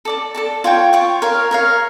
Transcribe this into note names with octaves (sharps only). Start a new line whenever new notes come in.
A4 D5 A5
A4 D5 A5
F4 C#5 G5
F4 C#5 G5
A#4 C#5 F5
A#4 C#5 F5